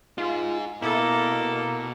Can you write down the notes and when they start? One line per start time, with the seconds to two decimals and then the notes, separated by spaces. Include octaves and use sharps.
0.18 D#4 F4 G#4
0.82 B2 A#3 E4 A4